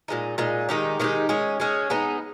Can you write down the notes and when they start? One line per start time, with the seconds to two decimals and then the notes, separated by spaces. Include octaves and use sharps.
0.08 A#2 G#3 D#4
0.38 A#2 G#3 D#4
0.69 D#3 G#3 D#4 G4
1.00 D#3 G#3 D#4 G4
1.29 G#3 C#4 G#4
1.60 G#3 C#4 G#4
1.90 G#3 B3 D#4